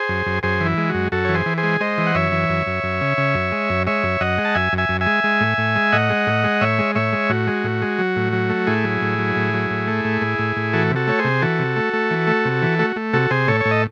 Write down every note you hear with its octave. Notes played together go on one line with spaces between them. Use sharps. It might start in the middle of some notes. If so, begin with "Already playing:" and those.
Already playing: G#4 C5
F#2
F#2
F#2 G#4 C5
E3
E4
G#3
F#4
F#2
F#2 F#4 A4
E3 C#5
G#4 C5
E3
G#4 C5
G#3
G#3 C5 D#5
E3
F#5
F#2 C#5 E5
E3
F#2
F#2
F#2
C#3
C#3
F#2
G#3
F#2
G#3 C#5 E5
F#2
F#2 D#5 F#5
G#3
A5
F#2 E5 G#5
F#2
E5 G#5
F#2
E5 G#5
G#3
G#3
A2
A2
G#3
A2 D#5 F#5
G#3
A2
G#3
A2 C#5 E5
G#3
A2 C#5 E5
G#3
A2 F#4
G#3
A2
G#3
F#3
A2
F#3
A3
A2 E4 G#4
F#3
A2
F#3
A2
F#3
A2
A3
A2
A2
A2
A2
E3 F#4 A4
C3
F#4 A4
A3 C#5
G#4 C5
C3
E3 F#4 A4
C3
A3
A3
E3
A3
C3
E3
A3 F#4
A3
C3 F#4 A4
C3 G#4 C5
A2 A4 C#5
A2 C#5
D#5